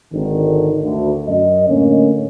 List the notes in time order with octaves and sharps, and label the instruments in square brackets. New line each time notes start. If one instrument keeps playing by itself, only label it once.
[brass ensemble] G#1 D3 D#3
D2
F#2 D#5
A2 D3 A#3 C#4